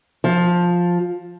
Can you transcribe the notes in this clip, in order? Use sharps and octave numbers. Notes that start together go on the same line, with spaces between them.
F3